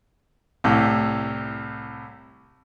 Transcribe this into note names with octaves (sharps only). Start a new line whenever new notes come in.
C2 A2